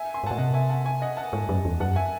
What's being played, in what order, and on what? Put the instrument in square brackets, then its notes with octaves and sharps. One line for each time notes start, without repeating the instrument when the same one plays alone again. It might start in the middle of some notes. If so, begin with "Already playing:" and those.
Already playing: [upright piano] E5 G#5
G#5 C6
[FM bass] G#2
[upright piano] F#5 A5
[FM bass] A2
[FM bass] C3 [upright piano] D#5 F#5
[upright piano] E5 G#5
F#5 A5
E5 G#5
D#5 F#5
F#5 A5
[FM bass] G#2
F#2
E2
[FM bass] F#2 [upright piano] F#5 A5
[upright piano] E5 G#5